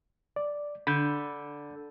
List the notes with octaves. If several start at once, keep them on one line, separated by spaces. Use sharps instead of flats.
D5
D3 B5 G6